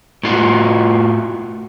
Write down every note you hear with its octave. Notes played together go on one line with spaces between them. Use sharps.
A2 F4 F#4